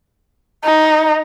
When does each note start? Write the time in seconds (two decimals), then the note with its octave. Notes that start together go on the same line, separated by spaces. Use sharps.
0.64 D#4